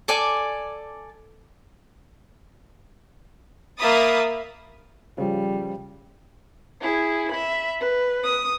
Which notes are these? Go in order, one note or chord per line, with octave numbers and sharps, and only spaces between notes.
A4 D5 G#5 D6
A#3 E5 B5 D#6 A6
C#3 F3 G3
E4 G#4
E5 B5
B4
D#6